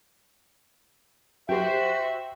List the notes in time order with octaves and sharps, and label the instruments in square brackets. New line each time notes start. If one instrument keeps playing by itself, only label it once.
[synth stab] F#2 G4 [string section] F#4 C5 [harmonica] E5 [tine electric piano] G5